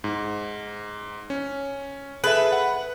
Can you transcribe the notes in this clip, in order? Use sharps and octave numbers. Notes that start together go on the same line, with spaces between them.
G#2
C#4
G#4 A4 B4 E5
F#5